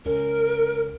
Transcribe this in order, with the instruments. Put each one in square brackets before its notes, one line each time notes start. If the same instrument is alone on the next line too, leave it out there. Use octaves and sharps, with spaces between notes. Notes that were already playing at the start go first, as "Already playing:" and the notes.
[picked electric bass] C#2 C#4 [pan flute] A#4